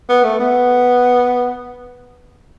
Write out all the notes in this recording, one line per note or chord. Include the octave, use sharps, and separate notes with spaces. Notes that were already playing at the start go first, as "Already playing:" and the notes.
B3
A3
B3